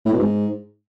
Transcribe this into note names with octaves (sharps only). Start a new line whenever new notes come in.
A2
B2
G#2